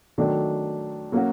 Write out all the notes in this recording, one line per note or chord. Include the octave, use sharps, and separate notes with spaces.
D#3 F#3 A3 D4
F#3 A#3 C#4 F#4